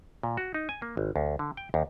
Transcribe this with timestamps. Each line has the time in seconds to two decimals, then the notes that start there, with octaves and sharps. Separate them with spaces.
0.23 A#2
0.37 F#4
0.54 D#4
0.69 G#5
0.82 A#3
0.97 G#1
1.16 D2
1.39 D3
1.57 G5
1.74 D#2